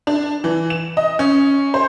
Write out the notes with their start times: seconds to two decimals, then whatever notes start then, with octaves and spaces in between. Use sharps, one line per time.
0.07 D4
0.44 E3
0.70 E7
0.97 D#5
1.19 C#4
1.74 C5